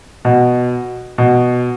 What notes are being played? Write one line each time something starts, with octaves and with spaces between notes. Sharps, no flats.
B2
B2